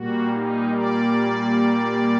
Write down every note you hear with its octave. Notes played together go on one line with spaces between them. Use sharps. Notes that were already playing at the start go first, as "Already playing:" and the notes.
Already playing: A#2 G3 A#3 F#4
D#4
D5